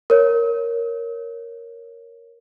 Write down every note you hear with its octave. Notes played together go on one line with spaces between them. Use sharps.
A#4 C#5